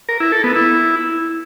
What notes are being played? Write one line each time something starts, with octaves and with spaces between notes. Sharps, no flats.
A#4
E4
A4
B3
E4